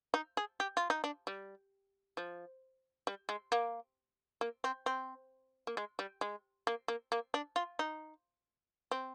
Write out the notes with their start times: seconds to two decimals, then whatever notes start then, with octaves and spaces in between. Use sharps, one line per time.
0.14 D#4
0.37 G#4
0.60 G4
0.77 F4
0.90 D#4
1.04 D4
1.27 G3
2.17 F3
3.07 G3
3.29 G#3
3.52 A#3
4.41 A#3
4.64 C4
4.86 C4
5.67 A#3
5.77 G#3
5.99 G3
6.21 G#3
6.67 A#3
6.88 A#3
7.12 A#3
7.34 D4
7.56 F4
7.79 D#4
8.91 C4